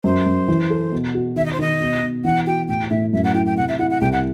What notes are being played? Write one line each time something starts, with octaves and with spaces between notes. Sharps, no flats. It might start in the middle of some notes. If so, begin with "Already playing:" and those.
F#2 C5
F#2
E3
A4
B2
F#4
D#3 E5
D#5
C5
D#3 D#5
B2
B2
E3 F#5
F#4 G5
A2 G5
A2 E5
F#2 E5
F#5
E4 G5
G5
C3 F#5
E5
E4 F#5
F#5
C2 G5
F#5